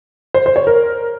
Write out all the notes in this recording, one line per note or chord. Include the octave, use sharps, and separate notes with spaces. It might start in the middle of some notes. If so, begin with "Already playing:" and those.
C5
C5
C#5
A#4